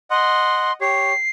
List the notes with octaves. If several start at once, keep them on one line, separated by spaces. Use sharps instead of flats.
D#5 F#5 C6
G4 C#5 C7